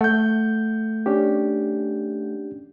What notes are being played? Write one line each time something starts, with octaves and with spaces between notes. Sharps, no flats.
A3 F#5 G6
C#4 D4 G4